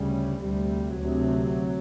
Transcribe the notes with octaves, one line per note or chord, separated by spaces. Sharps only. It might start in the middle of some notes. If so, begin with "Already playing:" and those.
Already playing: D2 C#3 G3
D2 C3 G3
D2 C3 F#3